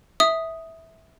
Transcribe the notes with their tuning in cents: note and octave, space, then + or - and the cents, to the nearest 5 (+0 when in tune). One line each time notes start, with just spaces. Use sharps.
E5 -15 D#6 +0